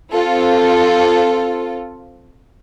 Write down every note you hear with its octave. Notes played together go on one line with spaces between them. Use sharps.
C4 F4 A4